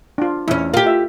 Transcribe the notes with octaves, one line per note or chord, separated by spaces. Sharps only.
D4 F4
E2 C#4 E4
F4 G4 A#4
E5